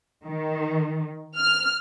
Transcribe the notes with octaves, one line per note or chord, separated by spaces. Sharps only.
D#3
F6